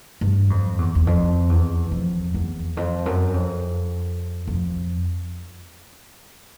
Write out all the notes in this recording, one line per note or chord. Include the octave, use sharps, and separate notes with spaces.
G2
F2
E2
E2
F2
E2
F2
E2
F2
F#2
F2
F2